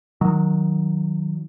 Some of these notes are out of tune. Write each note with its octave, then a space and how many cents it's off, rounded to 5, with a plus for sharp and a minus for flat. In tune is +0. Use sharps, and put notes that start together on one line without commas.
D#3 +0 F#3 -15